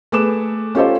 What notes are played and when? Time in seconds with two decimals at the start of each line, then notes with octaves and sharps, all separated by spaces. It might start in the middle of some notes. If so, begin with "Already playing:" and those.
0.12 A3 G#4 B4 D6 E7
0.75 C#4 F4 G4 A4 C5